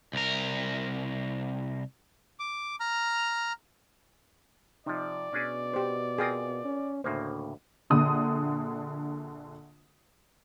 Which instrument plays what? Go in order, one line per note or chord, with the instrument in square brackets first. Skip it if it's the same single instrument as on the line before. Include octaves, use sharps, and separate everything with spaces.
[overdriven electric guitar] C2 A#4
[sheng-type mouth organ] D6
A#5 F6
[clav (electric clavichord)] C3 F3 [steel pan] D#4 [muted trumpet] D5
[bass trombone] B2 [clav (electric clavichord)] C#4 D4 G#4
[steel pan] G4 C5
[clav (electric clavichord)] C4 F4 A#4 [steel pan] G#4 G5 D#6
[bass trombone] C#4
[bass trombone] D2 [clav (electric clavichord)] A2 C#3 A#3 [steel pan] C5
[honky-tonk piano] A#1 D3 D#6